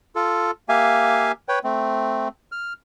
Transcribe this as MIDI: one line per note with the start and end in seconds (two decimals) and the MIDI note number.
0.16 0.51 65
0.16 0.51 69
0.69 1.32 58
0.69 1.32 67
0.69 1.32 76
0.69 1.32 77
0.69 1.32 80
1.49 1.59 71
1.49 1.59 73
1.49 1.59 79
1.64 2.28 57
1.64 2.28 60
2.52 2.73 89